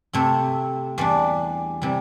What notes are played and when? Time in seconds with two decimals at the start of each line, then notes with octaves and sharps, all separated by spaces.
0.13 C3 A3 C4
0.98 E2 E3 G3 D4
1.82 C3 E3 G3